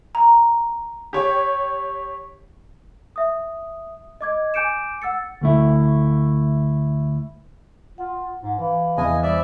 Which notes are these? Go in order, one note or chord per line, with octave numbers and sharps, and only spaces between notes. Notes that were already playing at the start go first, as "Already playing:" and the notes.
A#5
G4 C#5
E5 D#6
D#5 D6 G#6
G#5 D6 G6 C#7 D7 E7
F#5 E6 A6 C#7
D2 A3 E4
F4 F#5
G#2
E3 F5
E2 D#5 G#5
G3 C5 D5 E5